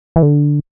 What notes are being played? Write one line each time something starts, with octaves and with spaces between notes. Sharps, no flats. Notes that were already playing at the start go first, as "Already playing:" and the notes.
E3
D3